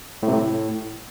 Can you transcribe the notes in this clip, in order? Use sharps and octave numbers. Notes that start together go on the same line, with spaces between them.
A2
C3
A2